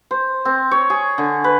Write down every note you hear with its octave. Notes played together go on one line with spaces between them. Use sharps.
C5
C4
C#5
G#4
D3
B4